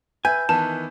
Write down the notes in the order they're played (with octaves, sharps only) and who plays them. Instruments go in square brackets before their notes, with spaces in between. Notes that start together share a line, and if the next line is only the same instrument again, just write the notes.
[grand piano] B4 E5 [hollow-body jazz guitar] G#5 [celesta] G6
[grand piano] D#3 E3 B3 [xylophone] A5